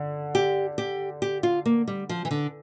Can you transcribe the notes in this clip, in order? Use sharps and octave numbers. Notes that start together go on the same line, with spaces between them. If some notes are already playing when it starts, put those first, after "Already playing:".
Already playing: D3
G4
G4
G4
F4
A#3
G3
F3
E3
D3